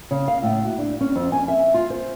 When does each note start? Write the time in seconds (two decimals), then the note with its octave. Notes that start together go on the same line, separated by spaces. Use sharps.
0.11 C#3
0.28 F5
0.43 A2
0.65 F#4
0.78 D4
1.01 C#4
1.16 F2
1.32 G#5
1.48 E5
1.74 F4
1.90 C5